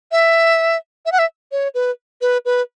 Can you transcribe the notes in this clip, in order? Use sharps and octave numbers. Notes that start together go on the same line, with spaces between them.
E5
E5
F#5
E5
C#5
B4
B4
B4